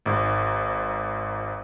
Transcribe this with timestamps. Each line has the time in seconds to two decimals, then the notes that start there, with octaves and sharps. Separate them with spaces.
0.06 G#1 G#2